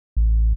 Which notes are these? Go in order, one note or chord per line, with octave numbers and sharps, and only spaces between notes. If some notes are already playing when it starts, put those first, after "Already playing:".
A1